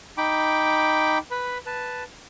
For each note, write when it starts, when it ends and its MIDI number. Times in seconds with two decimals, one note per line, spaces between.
0.18 1.18 63
0.18 1.18 79
0.18 1.18 83
0.18 1.18 86
1.31 1.58 71
1.31 1.58 83
1.66 2.04 71
1.66 2.04 81